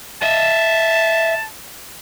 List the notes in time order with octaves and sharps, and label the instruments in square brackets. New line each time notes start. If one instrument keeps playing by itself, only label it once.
[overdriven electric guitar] D#5 E5 [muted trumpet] A5